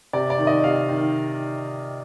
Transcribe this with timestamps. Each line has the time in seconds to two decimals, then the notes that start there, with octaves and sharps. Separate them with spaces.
0.13 C3 D5
0.30 D5
0.39 D#3
0.47 D#5
0.64 C3 F5
0.89 D#3